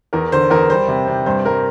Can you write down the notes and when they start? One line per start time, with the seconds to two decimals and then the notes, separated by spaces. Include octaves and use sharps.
0.13 E2 A#4
0.32 D3 C5
0.50 E2 A#4
0.70 G3 C5
0.88 C3
1.07 C3
1.26 G2 C5
1.45 G2 A#4